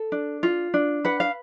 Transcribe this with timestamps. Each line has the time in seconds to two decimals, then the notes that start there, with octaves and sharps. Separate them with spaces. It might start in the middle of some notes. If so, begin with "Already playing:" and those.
Already playing: A4
0.12 D4
0.43 F4
0.74 D4
1.05 B4 F#5
1.20 F5